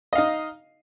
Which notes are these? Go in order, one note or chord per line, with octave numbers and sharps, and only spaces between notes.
D#4 D#5 F5